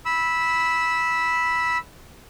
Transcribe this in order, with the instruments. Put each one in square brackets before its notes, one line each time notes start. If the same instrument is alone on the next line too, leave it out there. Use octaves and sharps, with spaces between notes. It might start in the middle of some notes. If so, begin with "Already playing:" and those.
[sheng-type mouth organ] B5 E6